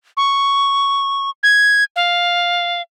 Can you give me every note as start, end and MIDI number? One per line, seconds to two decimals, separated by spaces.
0.17 1.30 85
1.43 1.84 92
1.96 2.82 77